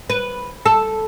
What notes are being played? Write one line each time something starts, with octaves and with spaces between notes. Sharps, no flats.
B4
A4